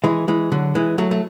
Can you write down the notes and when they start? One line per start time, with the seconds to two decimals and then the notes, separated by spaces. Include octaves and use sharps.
0.04 E3 G#3
0.28 E3 G#3
0.52 D3 F#3
0.75 E3 G#3
0.98 F#3 A3
1.11 A3